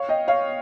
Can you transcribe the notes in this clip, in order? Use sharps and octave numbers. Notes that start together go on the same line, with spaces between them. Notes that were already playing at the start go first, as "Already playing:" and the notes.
Already playing: C#5 F5
D#5 G5
C#5 F5